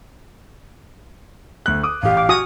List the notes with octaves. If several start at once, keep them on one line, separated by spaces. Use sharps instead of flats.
D2 F#6
D6 D#6
A1 G4 F5
D6
F#4 G#5 C#6 D#6 F6